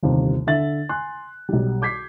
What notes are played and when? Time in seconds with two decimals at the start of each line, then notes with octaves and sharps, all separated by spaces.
0.03 G1 D#2 C3
0.47 D3 E5 A6 F#7
0.89 G#5 C6 F#6
1.49 B1 G3
1.82 D6 G6 G#6 B6 C7